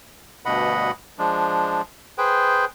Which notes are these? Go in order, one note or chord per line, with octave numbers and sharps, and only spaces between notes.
D2 G2 B2 D#5 F#5 B5
F3 G#3 D4
G#4 B4 C5 G5